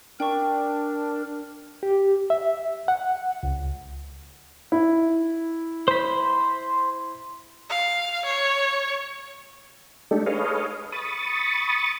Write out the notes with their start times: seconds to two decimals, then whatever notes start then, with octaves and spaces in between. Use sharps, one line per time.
0.20 D4 A#4 G5 C#6
1.83 G4
2.30 E5
2.88 F#5
3.43 C#2
4.72 E4
5.88 C5 B5
7.70 F5
8.25 C#5
10.11 G#3 A3 D4 D#4 G4 A4
10.26 G#4 A4 B4 C#5 D#5 F5
10.92 B5 C#6 D#6 A6